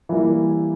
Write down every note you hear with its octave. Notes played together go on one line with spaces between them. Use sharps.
E3 G3 A#3 E4